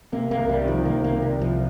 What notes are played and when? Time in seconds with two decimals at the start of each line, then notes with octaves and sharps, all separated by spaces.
0.12 C3 A#3
0.31 A#3
0.37 C2
0.49 G3
0.62 D#3
0.68 F3
0.85 C2 A#3
1.04 A#3
1.11 C3
1.22 G3
1.35 C2
1.41 F3